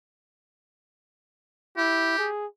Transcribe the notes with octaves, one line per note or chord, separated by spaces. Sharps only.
E4 G4
G#4